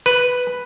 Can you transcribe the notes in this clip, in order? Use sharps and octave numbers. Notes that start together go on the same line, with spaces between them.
B4